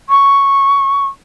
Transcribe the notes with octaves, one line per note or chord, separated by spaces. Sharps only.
C#6